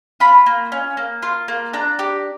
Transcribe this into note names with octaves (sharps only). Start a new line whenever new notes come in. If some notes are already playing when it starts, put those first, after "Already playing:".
F4 B5
A#3
C#4
A#3
F4
A#3
D4 A#5
G4